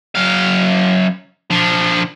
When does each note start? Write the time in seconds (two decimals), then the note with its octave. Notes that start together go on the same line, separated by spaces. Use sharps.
0.15 F#2 F5
1.51 F3 D4